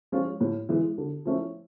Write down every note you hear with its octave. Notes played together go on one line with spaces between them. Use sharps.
F3 G#3 C#4 F4
A2
E3 G#3
D3
F3 A3 C#4 E4